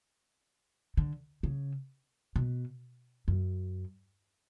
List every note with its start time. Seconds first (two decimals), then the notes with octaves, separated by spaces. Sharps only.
0.97 D3
1.43 C#3
2.36 B2
3.28 F#2